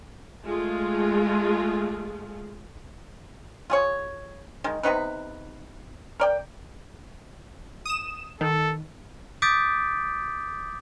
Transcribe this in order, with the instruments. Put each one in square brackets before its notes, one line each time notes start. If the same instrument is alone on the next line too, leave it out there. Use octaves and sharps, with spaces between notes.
[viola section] G#3 A3 F4 G#4
[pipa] F4 G#4 C#5
D#3 G#3
C3 B3 D#4 B4
A#4 D5 G5
[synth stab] D#6 E7
[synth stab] D#3 [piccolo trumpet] A4
[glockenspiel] D6 D#6 G6 A6 B6 D7